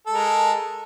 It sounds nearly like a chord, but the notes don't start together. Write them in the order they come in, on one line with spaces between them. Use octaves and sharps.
A4 G#3 A#4